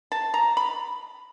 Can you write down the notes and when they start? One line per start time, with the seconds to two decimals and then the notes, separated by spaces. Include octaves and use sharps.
0.12 A5
0.34 A#5
0.57 B5